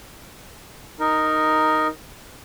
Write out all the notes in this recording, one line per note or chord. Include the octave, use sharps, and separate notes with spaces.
D#4 A#4